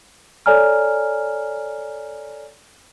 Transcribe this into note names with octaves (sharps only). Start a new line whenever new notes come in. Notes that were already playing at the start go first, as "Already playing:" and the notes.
A4 C#5 D5 G#5 A#5 F6